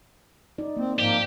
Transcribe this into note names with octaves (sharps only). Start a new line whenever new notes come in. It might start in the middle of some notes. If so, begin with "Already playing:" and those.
D#4 D5
A#3 C4
G#2 F3 A#3 G4 D5